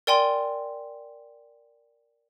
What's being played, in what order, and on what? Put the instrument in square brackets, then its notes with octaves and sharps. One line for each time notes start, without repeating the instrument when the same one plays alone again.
[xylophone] A#4 D5 G5 G#5 C6